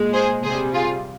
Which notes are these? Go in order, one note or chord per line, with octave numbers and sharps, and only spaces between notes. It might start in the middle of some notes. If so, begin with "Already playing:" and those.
Already playing: A#2 G#3
G#4 C5
C3 G3 G#4 C5
F4 G#4